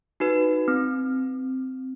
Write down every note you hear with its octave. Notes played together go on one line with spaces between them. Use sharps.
D#4 F#4 B4
C4